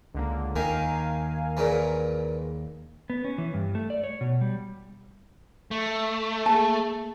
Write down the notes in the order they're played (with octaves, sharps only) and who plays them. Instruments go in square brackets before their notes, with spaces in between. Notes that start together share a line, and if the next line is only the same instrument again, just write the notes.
[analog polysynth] C#2 D3 A#3
[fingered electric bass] D#2 [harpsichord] D#3 [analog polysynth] A#4 F5 G#5
[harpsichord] A#2 C#3 E3
[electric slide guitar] B3
C#4
E3
G2
A3
D5
C#5
B2
G3
[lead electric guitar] A3
[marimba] A#3 G#4 [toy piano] A5